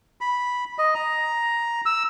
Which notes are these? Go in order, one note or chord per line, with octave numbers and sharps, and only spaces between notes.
B5
D#5
A#5
E6